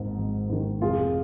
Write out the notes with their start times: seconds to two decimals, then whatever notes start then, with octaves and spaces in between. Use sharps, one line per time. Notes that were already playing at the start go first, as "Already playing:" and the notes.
Already playing: G#1 G#2 D#3
0.18 G#1
0.50 G#2 D#3
0.81 F1 F4 G#4